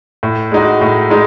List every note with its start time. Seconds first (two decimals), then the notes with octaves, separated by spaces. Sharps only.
0.23 A2
0.52 G#3 D#4 F#4
0.81 A2
1.10 G#3 D#4